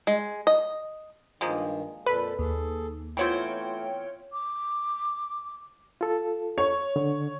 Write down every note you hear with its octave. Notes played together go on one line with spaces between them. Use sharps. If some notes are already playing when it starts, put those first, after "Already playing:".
G#3
D#5
G2 D#3 F3 G#3 A#3
F2 A#2 A4 B4
D#2 G#4 A4
E3 A3 B3 C4 F4 C#5 G5
D6
F4 A4
C#5
D3